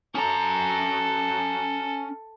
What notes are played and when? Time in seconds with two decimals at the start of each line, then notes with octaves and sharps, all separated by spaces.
0.15 C#4 A4 A#5